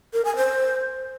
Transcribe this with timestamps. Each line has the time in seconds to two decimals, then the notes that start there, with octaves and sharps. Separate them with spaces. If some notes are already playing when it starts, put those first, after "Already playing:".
0.13 A#4
0.25 G#5
0.36 C5